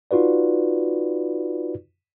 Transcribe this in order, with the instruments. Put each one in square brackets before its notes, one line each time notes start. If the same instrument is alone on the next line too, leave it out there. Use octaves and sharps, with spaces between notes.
[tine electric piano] D#4 F4 F#4 B4 D5